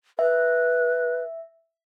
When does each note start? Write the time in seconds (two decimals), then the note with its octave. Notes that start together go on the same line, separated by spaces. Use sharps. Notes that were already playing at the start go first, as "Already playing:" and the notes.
0.19 B4 E5